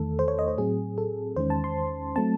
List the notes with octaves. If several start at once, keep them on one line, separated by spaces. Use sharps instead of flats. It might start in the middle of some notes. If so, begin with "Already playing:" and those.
Already playing: E2 D#3 A3 A4
C5
C#5
D#5
C5
A2 F#3 C4 G#4
A4
E2 D#3 G#3 C#4 C5
A5
C6
F#3 A3 C4 A5